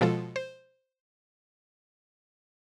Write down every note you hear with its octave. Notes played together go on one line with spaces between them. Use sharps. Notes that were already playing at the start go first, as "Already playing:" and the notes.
B2 F3 G#3 F4 A4
C5